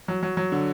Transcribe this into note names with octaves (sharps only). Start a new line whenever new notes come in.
F#3
F#3
F#3
D3